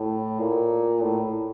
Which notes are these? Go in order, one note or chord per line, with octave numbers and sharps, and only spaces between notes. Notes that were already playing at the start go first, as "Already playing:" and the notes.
Already playing: A2
A#2
A2